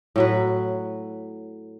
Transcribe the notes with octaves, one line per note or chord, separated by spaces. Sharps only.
A2 F#3 B4